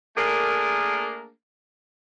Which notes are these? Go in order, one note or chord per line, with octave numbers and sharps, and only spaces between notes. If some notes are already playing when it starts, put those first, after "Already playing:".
A3 A#3 D4 G#4 A#4